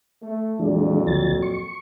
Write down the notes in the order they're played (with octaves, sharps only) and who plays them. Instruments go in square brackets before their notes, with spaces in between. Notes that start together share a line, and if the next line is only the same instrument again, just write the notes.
[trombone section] A3
[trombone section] F2 A#2 F#3 [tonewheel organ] E3 G#3 D4
[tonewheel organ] D2 F3 A6
C#6